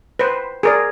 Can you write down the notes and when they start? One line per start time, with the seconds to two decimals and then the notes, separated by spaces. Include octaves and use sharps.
0.19 B4 C5
0.63 G#4 A#4 D5